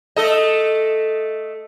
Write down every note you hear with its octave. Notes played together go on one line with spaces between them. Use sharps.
A3 A4 D#5